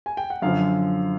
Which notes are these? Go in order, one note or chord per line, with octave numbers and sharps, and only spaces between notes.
G#5
G5
F#5
F#2 D3 F3 F5